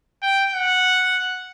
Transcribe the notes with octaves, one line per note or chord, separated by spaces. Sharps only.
G5
F#5